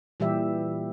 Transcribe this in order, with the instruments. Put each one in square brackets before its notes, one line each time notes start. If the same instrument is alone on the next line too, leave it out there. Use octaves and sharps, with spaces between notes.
[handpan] A#2 E3 G3 G4 E5